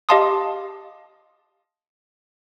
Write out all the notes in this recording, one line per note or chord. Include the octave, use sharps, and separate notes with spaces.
G4 D#5 F5 A5 C6 D#6